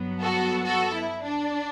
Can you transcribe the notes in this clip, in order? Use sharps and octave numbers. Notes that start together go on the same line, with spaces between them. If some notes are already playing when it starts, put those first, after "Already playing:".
Already playing: G2 F#3 B3
F#4 A4
F#4 A4
E4
D4